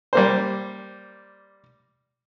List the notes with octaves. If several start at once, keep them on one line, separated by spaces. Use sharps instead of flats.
G3 A#3 C5